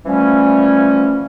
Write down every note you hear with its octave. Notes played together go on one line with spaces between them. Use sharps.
E3 F3 G3 A3 C#4